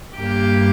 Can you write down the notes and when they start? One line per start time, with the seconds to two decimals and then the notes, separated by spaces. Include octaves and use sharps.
0.17 G2 G3 A#3 G4